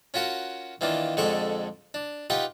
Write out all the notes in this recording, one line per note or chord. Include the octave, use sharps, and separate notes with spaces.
C#4 F4 F#4 A#4 F#5
D#3 E3 A#3 D4 F4
F2 D3 G#3 A4 C#6 D6
D4
D#4 F4 G4 B4 F#5